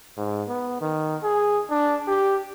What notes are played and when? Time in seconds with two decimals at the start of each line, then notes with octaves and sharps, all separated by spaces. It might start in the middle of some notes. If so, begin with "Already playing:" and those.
0.17 G#2
0.48 B3
0.81 D#3
1.23 G#4
1.70 D4
2.08 G4